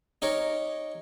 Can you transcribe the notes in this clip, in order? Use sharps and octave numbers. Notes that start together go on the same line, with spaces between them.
D#4 G4 A#4 C#5